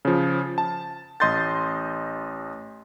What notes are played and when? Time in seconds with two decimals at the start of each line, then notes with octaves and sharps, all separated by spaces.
0.05 C#3 F3
0.58 A5
1.20 A1 D#5 C6 G6 A6